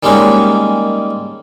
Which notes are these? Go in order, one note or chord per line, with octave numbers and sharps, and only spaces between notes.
D#3 G3 G#3 A#3 C#4